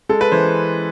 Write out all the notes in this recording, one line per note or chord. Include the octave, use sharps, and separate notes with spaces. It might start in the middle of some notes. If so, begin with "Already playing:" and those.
G#3 A4
B4
E3 C5